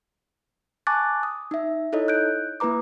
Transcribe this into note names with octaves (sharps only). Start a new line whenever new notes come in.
G#5 A5 C#6 D6 F#6 A6
D#6
D#4 E5
D#4 E4 A4 C#5 D#5
F#6 G6 D7
A#3 E4 B4 A#5 D6